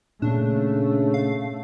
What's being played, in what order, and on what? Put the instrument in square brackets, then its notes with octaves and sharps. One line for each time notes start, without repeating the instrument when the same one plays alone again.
[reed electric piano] A#2 [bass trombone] C#3 [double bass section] A3 [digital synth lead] D4
[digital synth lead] F5